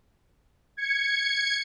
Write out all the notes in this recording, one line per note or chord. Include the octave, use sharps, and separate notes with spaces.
G#6 C#7